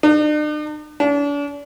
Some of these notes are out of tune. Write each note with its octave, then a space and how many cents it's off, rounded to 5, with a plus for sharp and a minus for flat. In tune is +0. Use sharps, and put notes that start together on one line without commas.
D4 +45
D4 -40